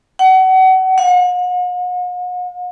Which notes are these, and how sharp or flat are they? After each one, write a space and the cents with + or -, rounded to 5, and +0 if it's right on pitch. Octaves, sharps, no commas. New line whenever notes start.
F#5 +30
F#5 -45